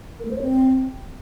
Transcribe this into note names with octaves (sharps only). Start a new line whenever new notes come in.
A#4
A3
C5
C#5
C4